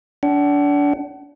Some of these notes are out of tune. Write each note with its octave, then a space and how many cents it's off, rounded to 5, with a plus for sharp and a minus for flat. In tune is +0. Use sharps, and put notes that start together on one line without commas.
D4 -30 F#5 +35